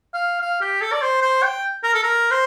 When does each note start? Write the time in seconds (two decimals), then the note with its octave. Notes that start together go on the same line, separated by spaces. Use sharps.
0.14 F5
0.41 F5
0.61 G4
0.81 A4
0.92 D5
1.02 C5
1.22 C5
1.43 G5
1.83 A#4
1.94 A4
2.03 A#4
2.31 C5